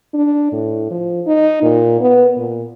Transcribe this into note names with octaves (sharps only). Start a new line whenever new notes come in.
D4
A2
F3
D#4
A#2
B3
A#2